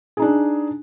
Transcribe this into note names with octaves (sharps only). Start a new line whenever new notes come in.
D4 D#4 G#4